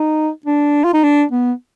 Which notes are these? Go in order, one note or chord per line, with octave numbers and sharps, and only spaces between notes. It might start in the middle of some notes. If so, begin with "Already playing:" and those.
Already playing: D#4
D4
F4
D#4
D4
B3